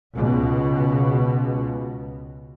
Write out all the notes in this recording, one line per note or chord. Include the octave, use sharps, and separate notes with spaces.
C#2 B2